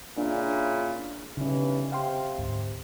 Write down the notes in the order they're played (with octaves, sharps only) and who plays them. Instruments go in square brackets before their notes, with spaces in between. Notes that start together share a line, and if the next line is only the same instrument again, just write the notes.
[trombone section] A#2 C#3 E4 [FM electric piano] D4
[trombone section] B1 G2 E3 [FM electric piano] C#3 C#4
[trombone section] C3 [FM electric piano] F5 G5 C6
[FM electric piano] D2 G#2